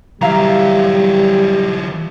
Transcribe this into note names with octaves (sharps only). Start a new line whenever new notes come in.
E3 F#3 G3 E5 F5 A#5